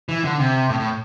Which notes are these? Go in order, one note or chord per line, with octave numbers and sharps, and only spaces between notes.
E3
D3
C3
A2
A2